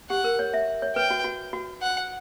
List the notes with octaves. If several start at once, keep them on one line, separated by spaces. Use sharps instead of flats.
G4 F#5
A#4
C#5
E5
C#5
B4 G5
F#4
F#4
F#4
F#5